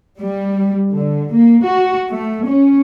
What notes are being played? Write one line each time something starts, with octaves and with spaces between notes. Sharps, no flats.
G3
D3
A#3
F#4
A3
C#4